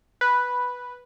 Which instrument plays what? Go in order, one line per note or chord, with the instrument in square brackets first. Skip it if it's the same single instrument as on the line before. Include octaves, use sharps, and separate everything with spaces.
[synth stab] B4